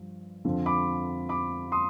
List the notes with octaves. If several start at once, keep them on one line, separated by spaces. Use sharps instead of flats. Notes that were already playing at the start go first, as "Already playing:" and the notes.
Already playing: G2 F3
F2 D3 F3
B5 D6
B5 D6
C6 D#6